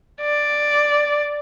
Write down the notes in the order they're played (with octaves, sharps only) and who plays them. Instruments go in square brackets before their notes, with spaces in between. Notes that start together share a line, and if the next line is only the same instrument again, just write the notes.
[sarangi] D5